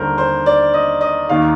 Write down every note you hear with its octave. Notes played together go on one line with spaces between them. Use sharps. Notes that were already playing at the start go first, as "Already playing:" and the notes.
Already playing: D#2 D3 G3 A#4 C5
C5
D5
D#5
D#5
D#2 D#3 A#3 D#4 F5